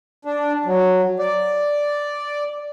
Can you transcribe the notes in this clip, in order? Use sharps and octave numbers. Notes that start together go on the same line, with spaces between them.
D4
F#3
D5